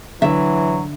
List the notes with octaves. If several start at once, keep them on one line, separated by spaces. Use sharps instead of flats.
D3 E3 F#3 E5